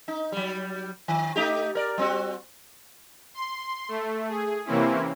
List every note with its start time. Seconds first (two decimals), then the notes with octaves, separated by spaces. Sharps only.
0.08 D#4
0.32 F#3 G3
1.08 D#3
1.36 A3 D#4 G4
1.75 A#4 D5
1.98 G3 C4 F#4
3.34 C6
3.89 A3
4.29 G#4
4.65 C3 E3 A#3 C4 C#4 E4